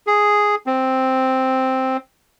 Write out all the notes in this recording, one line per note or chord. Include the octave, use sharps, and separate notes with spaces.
G#4
C4